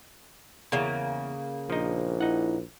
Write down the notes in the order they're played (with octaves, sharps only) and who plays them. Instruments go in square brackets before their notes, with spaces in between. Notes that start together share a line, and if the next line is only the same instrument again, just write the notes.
[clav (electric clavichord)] E2 [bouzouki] C#3 A#3
[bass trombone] A#1 [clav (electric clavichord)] F3 D#4
[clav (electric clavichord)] D#4 F#5 [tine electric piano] E4